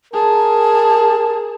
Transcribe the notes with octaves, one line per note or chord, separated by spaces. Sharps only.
G#4 A#4 A5